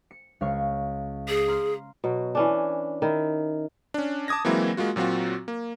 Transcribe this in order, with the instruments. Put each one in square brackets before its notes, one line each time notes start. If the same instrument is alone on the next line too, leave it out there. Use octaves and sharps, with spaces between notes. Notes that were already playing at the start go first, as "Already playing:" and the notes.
[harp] C#7
C#2 F5 C#6
[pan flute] G#4
[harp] A#5 C6 F6
[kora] B2 F#3
E3 C#4 D4
D#3 E4
[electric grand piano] C#4 D4
A5 D6 D#6 G#6 A#6
E3 F#3 G#3 A#3 C4 E4
G#3 A#3 F4 F#4
A#2 F#3 C4 F4 F#4
A#3